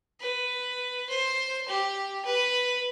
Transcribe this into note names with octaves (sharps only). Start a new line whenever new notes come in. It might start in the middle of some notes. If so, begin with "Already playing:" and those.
B4
C5
G4
B4